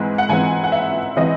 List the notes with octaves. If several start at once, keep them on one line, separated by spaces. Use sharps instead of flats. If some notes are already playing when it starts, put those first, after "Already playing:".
Already playing: G#2 E3 G#3 C4
F#5
G#2 E3 G#3 C4 G#5
F#5
E5
E3 G#3 C4 D#5